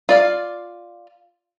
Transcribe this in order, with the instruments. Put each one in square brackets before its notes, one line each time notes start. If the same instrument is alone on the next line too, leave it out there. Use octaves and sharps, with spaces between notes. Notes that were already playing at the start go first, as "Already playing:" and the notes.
[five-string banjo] F4 D5 F5